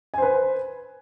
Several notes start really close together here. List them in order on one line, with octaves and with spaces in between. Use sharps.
G#5 C5 B4